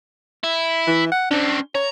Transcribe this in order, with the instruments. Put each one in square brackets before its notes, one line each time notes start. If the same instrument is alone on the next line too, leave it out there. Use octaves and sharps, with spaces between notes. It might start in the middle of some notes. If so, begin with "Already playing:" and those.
[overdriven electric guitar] E4
[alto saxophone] E3
F#5
[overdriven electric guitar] C#4 C5 [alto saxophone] D4
[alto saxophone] C#5 [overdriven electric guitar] A#5